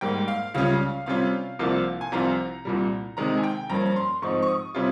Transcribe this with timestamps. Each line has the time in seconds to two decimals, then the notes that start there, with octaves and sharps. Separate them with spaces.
0.01 G#2 G3 A#3 G5
0.28 F5
0.54 C#2 C#3 G3 C#4 F4 F5
1.06 C3 G3 C#4 F4 F5
1.59 C2 C3 F3 A#3 F4
2.01 G#5
2.12 C2 C3 F3 C4 F4 A#5
2.65 C2 A#2 G3
3.17 C3 D#3 G#3 D#4 A#5
3.37 G#5
3.44 G5
3.70 G2 F3 A#3 C#4 A#5
3.86 A#5
3.96 C6
4.22 G#2 F3 C4 D#4 C#6
4.42 C#6
4.48 D#6
4.75 C3 G3 C#4 F4